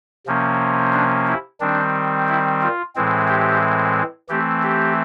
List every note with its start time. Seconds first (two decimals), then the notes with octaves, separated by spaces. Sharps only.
0.27 C3 F3 A#3 C#4
0.94 D4
1.27 E4
1.60 D#3 G3 C4 D4
2.28 E4
2.62 F4
2.96 A2 E3 G#3 C4
3.28 G4
4.29 E3 A3 C4 G4
4.63 G4